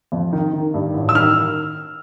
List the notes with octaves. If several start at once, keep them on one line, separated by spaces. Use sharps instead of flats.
F2
D#3
D#3
G2
A1
E6
D#3 F6